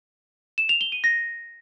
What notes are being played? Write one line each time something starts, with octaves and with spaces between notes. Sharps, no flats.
E7
F7
G7
D#7
A#6